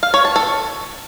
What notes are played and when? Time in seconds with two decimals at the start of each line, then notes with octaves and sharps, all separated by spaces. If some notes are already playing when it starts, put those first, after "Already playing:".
0.03 F5
0.14 C#5
0.25 A5
0.36 A4